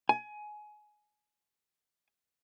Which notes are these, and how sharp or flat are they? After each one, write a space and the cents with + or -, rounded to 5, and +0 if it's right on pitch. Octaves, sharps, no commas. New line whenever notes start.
G#5 +20